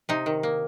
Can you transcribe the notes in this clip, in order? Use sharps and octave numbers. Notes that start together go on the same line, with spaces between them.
C3 D#4
D#3
A#3